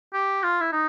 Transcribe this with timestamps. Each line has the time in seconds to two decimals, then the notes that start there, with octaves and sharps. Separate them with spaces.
0.13 G4
0.43 F4
0.61 E4
0.73 D#4